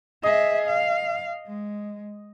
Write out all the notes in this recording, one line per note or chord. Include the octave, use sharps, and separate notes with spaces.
G#4 D#5 E5
F5
G#3